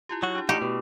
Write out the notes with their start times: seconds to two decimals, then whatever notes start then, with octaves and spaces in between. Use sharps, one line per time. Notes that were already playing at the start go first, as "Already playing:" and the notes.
0.09 E4 F4 G4
0.23 F#3 F#4
0.35 D4 G4
0.49 A3 D#4 E4 F#4 G4
0.62 B2